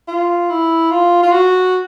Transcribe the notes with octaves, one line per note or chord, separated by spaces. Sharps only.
F4
E4
F4
F4
F#4